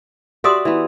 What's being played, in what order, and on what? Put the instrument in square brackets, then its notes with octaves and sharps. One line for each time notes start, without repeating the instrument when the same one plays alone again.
[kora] F#4 D5 E5 [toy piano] G4 C6 D#6
[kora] E3 B3